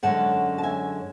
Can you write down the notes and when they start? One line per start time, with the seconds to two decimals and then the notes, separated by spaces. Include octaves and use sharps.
0.03 F#2 D3 G#3 C#4 F#5 A5
0.58 A5
0.63 E5 G#5